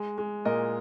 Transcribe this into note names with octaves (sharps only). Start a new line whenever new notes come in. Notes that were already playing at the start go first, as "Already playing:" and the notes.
Already playing: G#3
G#3
A#2 A#4 D#5